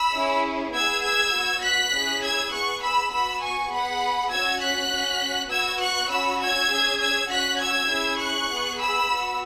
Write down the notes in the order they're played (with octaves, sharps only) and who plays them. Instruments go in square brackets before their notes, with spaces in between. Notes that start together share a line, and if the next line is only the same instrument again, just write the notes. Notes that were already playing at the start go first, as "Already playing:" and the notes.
Already playing: [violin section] B5 E6
C#4 E4 G#4
B3 G#4 E6 G#6
E6 G#6
B3 F#4
F#6 B6
C#4 E4 G#4
E6 G#6
B3 G#4 C#6 F#6
B5 E6
B3 F#4 B5 E6
G#5 C#6
B3 G#4 F#5 B5
C#4 F#4 E6 G#6
F#6 B6
C#4 F#4
B3 F#4 E6 G#6
C#6 F#6
C#4 F#4 B5 E6
E6 G#6
C#4 G#4
E6 G#6
C#4 F#4 F#6 B6
E6 G#6
C#4 E4 G#4
C#6 F#6
B3 G#4
B5 E6
B3 F#4